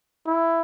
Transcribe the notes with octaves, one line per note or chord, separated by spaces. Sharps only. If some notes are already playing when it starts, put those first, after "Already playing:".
E4